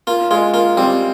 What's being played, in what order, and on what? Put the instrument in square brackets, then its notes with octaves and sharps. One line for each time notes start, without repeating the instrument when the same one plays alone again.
[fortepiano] A#3 [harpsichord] F4
[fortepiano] G#3 [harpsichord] F4
[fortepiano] A#3 [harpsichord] F4
[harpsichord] G3 [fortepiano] C4